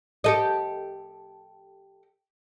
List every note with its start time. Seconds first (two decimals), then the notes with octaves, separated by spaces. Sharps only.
0.24 G4 A4 D#5